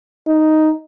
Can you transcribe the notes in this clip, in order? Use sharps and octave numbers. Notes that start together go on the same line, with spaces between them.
D#4